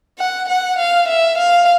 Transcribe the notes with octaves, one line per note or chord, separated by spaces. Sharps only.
F#5
F#5
F5
E5
F5